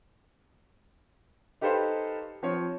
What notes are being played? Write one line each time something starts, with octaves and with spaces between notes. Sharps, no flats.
D#4 G4 A4 B4 C5 F5
F3 C4 C#5